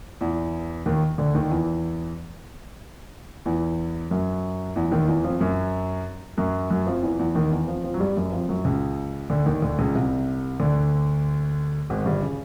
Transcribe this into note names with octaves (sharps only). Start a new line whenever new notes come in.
E2 E3
D#2 D#3
D2 D3
D#2 D#3
E2 E3
E2 E3
F#2 F#3
E2 E3
D#2 D#3
E2 E3
F2 F3
F#2 F#3
F#2 F#3
F#2 F#3
F2 F3
E2 E3
E2 E3
D#2 D#3
E2 E3
F2 F3
F2 F3
F#3
G2 G3
F#2 F#3
F2 F3
F#2 F#3
C#2 C#3
D2 D3
D#2 D#3
D2 D3
C#2 C#3
C2 C3
D2 D3
G#1 G#2
G1 G2
C#3